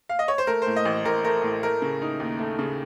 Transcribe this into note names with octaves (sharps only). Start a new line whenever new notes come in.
F5
D#5
C#5
C5
A3 A#4
C5
A2
D#5
A1
A1 A#4
A3 A#4
A2
A3 A#4
C#3
D#4
D#2
A3
C#3